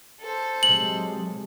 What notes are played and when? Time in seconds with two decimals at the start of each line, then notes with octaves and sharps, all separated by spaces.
0.21 A4 C5
0.63 C3 F#3 G#3 F#7